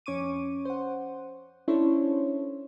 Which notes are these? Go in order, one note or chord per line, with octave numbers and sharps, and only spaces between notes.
F2 C#4 C#6 D6 D#7
C5 F#5
C#4 D4 E4 A4 C5 C#5